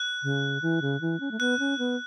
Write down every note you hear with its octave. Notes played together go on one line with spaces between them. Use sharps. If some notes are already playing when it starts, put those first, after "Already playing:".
Already playing: F#6
C#3
E3
C#3
E3
C#4
A3
B3 F#6
C#4
B3